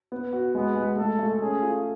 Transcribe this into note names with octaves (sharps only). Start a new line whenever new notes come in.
B3
F#4
G#3 B3
G#3
A3 A4
A3
C#4 G#4
F4